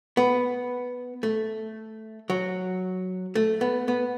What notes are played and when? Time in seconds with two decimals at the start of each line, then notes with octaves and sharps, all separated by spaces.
0.17 B3
1.23 A3
2.30 F#3
3.35 A3
3.61 B3
3.88 B3